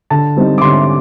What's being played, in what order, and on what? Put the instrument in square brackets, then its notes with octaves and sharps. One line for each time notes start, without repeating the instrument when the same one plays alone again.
[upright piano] D3 A5
G3 C4 D#4
D6
D3 C6